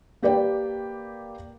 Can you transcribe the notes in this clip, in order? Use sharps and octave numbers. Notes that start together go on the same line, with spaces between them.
A#3 G4 B4 D5 G5